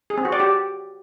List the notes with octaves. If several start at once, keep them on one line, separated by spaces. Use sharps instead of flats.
G#4
C4
F#4
D5
G4